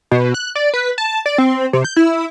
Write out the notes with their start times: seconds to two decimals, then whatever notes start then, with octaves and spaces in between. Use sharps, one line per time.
0.11 B2
0.34 F#6
0.55 D5
0.73 B4
0.98 A5
1.26 D5
1.38 C4
1.73 C3
1.84 G6
1.96 E4